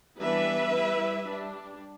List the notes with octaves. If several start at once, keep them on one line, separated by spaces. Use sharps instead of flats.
E3 G3 B3 D4 B4 E5
G3 E4
G3 D4